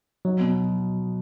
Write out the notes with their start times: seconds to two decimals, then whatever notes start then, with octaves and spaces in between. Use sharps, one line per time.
0.25 F#3 D#4
0.40 B2